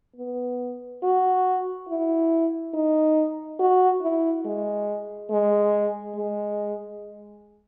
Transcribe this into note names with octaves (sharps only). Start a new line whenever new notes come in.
B3
F#4
E4
D#4
F#4
E4
G#3
G#3
G#3